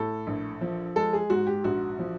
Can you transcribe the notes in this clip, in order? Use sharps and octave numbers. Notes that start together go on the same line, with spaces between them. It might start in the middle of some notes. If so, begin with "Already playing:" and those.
Already playing: A2 A4
A#1
F3
G#3 A4
G#4
G#2 F#4
G4
A#1 F#4
F3